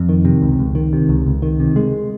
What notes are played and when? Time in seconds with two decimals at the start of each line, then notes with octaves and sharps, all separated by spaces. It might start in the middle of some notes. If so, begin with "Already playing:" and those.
Already playing: F2
0.09 D#3
0.25 C3
0.42 C#2
0.59 C#2
0.75 D#3
0.93 C3
1.09 C#2
1.27 C#2
1.42 D#3
1.60 C3
1.76 G#3